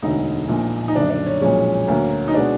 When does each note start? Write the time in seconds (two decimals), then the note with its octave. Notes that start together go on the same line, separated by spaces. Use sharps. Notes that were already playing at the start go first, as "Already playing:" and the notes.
0.02 E1 D2 D3 D#4
0.48 A#1 A#2 F3
0.88 D#4
0.95 F#1 F#2 D3 D4
1.10 D4
1.26 C#4
1.41 B1 A#2 F3 G#3 C#4
1.88 D2 D3 F#3 A#3
2.28 D#4
2.34 B2 G#3 B3 D4